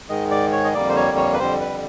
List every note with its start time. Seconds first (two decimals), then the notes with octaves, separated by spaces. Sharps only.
0.09 G#2 D#3 G#3 D#5
0.31 D5
0.52 C#5
0.64 D#5
0.74 F2 D3 G3 A#3 D5
0.89 C5
0.96 C#5
1.17 C#5
1.34 B4
1.39 F2 D3 G3 C5
1.61 B4